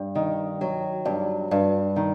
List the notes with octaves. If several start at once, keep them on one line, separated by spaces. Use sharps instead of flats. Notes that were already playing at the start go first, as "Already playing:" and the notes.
Already playing: G2
D#3
F#3
G2
G2
D#3